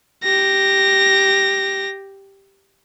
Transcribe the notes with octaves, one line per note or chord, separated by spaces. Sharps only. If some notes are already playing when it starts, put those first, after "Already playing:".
G4 A#6